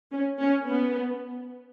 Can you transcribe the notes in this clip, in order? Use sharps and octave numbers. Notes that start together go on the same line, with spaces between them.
C#4
C#4
B3